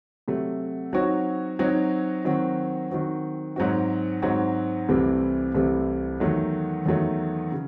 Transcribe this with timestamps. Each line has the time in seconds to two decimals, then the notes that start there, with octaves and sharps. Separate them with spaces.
0.28 C3 F#3 A3
0.93 F#3 C4 D#4 F#4 C#5
1.59 F#3 C4 D#4 F#4 C#5
2.25 D#3 F#3 C4 F#4
2.91 D#3 F#3 C4 F#4
3.56 G#2 F#3 C4 F#4
4.22 G#2 F#3 C4 F#4
4.89 C2 C3 E3 A3 C4
5.55 C2 C3 E3 A3 C4
6.20 E2 D#3 F#3 A3
6.86 E2 D#3 F#3 A3
7.52 C#3